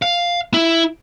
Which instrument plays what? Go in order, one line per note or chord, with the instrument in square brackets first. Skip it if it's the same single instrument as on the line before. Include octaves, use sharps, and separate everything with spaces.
[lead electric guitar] F5
E4